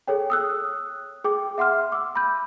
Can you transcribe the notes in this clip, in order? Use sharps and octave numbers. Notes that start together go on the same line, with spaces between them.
G#4 A4 C#5 G5
D#6 E6 F#6
G#4 G5 D6
E5 F#5 C6 F6
D6 E6
B5 G6